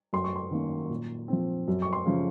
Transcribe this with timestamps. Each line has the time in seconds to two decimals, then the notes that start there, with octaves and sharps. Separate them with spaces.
0.13 F#2 C6
0.24 C#6
0.36 C6
0.51 D#3 A#3 C#4
0.90 A#2
1.28 F3 C4
1.68 F#2
1.82 C#6
1.93 C6
2.06 C#3 F3